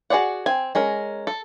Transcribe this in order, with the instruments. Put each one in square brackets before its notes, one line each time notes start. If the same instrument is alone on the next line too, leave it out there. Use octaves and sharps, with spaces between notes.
[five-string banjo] F#4 G#4 C#5 D5 F#5
C4 G#5
G#3 C#4 A#4
A4